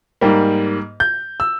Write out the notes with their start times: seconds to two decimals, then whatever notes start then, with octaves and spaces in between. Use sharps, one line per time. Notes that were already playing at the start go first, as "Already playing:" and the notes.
0.21 G#2 G3 A#3
1.00 G6
1.40 E6